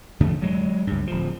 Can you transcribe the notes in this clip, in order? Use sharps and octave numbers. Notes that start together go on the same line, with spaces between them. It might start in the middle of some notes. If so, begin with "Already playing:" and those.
E2 D3 F3 A3
F#3 G#3
C#2 G2
D1 F3